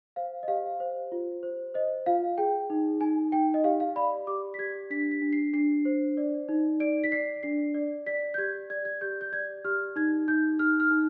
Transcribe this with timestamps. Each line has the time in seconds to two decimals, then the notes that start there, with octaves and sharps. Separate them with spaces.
0.16 C5 F5
0.43 D#5
0.48 G4 F5
0.80 C5
1.12 F4
1.43 C5
1.74 C5 D#5
2.06 F4 F5
2.38 G#4 G5
2.70 D#4
3.01 D#4 G#5
3.32 D#4 G5
3.54 D#5
3.64 G4 F5
3.80 F5
3.96 D5 B5
4.27 G4 D6
4.54 B6
4.59 G4 G#6
4.90 D4 B6
5.11 B6
5.22 D4
5.33 C7
5.53 D4 C7
5.85 C5
6.17 D5
6.49 D#4
6.80 D5 D7
7.04 B6
7.12 D5 C7
7.43 D4 C7
7.74 D5
8.06 D5 B6
8.34 G6
8.38 G4 G#6
8.70 D5 G#6
8.85 G#6
9.01 G4 G6
9.21 G6
9.32 D5 G#6
9.65 G4 F6
9.96 D#4 G#6
10.28 D#4 G6
10.59 D#4 F6
10.80 F6
10.91 D#4